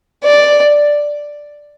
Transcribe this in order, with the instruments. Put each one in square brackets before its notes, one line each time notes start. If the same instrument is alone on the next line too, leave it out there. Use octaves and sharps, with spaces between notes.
[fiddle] D5